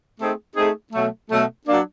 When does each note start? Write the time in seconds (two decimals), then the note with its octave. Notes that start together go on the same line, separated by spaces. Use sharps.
0.19 A3 C4 D#4 G#4
0.56 A3 C4 D#4 G#4
0.93 B2 F#3 A3
1.31 B2 F#3 A3
1.68 F#3 A#3 D4